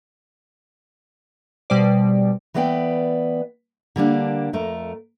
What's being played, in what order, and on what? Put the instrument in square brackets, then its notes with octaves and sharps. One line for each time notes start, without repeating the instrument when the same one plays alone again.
[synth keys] B2 G3 C5 D5
[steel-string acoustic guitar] E3 A3 B3 D5 F5 G5
D3 G3 A#3 D4
F2 A3 A#4